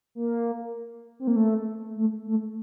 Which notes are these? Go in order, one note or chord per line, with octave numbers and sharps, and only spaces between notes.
A#3
C4
A#3
A3
A3
A3